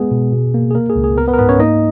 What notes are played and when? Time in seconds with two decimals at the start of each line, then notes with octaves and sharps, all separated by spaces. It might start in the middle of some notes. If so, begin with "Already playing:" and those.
Already playing: G#3 B3 G#4
0.11 B2
0.32 B2
0.54 A#3
0.71 G#4
0.75 A#3 A#4
0.90 G#4
0.96 C#2
1.04 G#4
1.17 B3 A#4
1.27 B3 B4
1.33 A#4
1.38 G#2 B3 B4
1.49 C#4 C#5
1.59 A#3 D#4 D#5